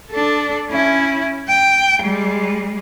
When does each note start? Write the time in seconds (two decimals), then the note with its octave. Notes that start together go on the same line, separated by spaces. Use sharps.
0.11 D4 A4
0.69 C#4 E4
1.48 G5
2.02 G3 G#3